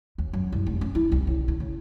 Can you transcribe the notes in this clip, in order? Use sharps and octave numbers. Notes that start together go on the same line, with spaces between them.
D#2
F#2
C2
F1
C#4
E4
C2
C#3
D3
C#3